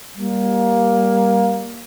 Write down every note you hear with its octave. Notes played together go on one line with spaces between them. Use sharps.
G3 A#3